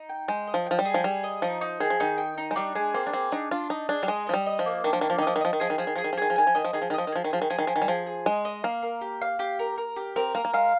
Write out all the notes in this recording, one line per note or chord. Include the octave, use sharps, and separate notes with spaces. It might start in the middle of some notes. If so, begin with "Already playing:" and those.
Already playing: D#4
G5
G#3 G5
D#5
F3
F3 G5
G3
G#4
F3
G3 G#4
D#5
F3 D#4
D#4
D#3 G#4
F3
D#3 D#4
G5
D#4
G#3
G3 D4
G#3 G#4
A#3 C4
D4
C4 G#4
D4 D#4
D4 F4
D#4 D#5
D4 G#4
G3
G#3 D#5
F3 D#5
G3
D#5
F3
A#3
D#3 D4
F3
D#3 A#3
F3
D#3 D#5
F3
D#3
F3 D#5
D#3
F3 G#4
D#3
F3 G#4
D#3
F3 G#4
D#3
F3
D#3 G#4
F3
D#3 G#5
F3
D#3 D#5
F3
D#3 G#4
F3
D#3
F3 D#5
D#3
F3 G#4
D#3
F3 G#4
D#3
F3 G#4
D#3
F3 G#5
D#3
G3
F3 G#4
G#4
G#3 D#5
D#5
A#3 F5
A#4
G4
F5
G4
A#4
A#4
G4
C4 A#4
A#3 A#4
A#3
G#3 F5